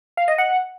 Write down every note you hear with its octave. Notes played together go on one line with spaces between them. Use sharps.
F5
D#5
F#5